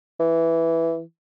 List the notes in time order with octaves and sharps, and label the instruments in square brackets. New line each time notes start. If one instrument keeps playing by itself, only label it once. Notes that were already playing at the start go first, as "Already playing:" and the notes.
[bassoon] E3